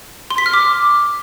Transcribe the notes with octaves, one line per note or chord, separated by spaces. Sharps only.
C6
B6
F6
D6